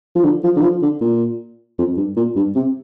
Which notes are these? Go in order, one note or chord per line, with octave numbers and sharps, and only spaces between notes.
F3
D3
F3
D3
F3
D3
A#2
F2
G2
A#2
G2
C3